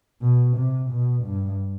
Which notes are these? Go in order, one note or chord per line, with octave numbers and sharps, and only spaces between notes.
B2
C3
B2
G2